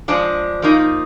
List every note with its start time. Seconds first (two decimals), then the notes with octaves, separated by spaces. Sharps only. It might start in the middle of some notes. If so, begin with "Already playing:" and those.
0.08 F3 G#3 D4
0.62 F3 A#3 D#4